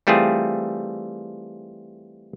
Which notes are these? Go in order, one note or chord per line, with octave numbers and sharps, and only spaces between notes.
E3 G3 A3 C4 F4 G#4